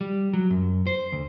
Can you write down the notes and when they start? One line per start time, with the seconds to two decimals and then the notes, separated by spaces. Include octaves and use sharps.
0.01 G3
0.33 F#3
0.50 F#2
0.87 C5
1.12 D2